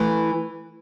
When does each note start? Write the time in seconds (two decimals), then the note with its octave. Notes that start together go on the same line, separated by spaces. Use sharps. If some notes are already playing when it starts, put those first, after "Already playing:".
Already playing: E3 A3